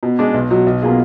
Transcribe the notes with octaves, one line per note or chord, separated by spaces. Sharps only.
B2
G#3 D4
B1
B2 F#3
B1
B2 A#3 F4 G#4